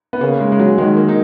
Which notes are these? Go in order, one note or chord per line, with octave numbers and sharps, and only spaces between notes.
B3
C#3 A#3
G#3
G#3
F#3
D#3 G#3
A#3
D#4